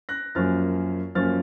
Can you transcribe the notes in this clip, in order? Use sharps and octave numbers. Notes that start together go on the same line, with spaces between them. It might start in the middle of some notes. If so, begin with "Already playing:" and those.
F#6 A#6
F#2 F3 A#3 C#4 F6 A6
F#2 F3 A#3 C#4 F6 A6